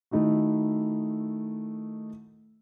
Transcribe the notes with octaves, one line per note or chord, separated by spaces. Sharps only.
D#3 A3 D#4 E4 F#4